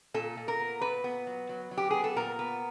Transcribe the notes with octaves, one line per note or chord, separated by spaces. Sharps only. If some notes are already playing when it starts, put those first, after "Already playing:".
A#2 A4
A#2
A#4
B3
A#2 B4
B3
F#3
F#3
F#3
G4
B3 G#4
A4
A#2 A#4
B3